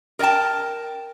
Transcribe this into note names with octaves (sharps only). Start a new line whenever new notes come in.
A#4 D5 D#5 G5 A5